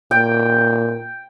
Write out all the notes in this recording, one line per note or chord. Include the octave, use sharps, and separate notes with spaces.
A#2 G5